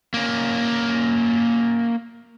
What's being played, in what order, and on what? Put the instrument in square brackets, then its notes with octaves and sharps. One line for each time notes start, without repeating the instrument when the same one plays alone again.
[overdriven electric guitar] A#3 C#4